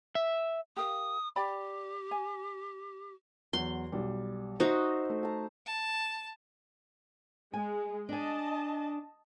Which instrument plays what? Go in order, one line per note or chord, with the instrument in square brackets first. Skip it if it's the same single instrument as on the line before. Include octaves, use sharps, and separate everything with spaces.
[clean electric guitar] E5
[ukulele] G4 A#4 F5 [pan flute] D#6
[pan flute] G4 [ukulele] D5 G5 B5
[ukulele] G#5
[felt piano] E2 F#3 [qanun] C6
[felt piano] B1 G3
[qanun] D#4 F#4 [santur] C5 E5 [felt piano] D#5
[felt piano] A3
[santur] A5 A#5
[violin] A5
[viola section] G#3 G#4 [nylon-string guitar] G#5
[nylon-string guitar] D4 G#5 [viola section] D#5 A5